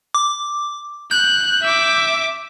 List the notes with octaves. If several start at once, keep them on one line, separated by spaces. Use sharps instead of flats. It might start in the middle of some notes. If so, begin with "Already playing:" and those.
D6
F#6 G6
E5 D6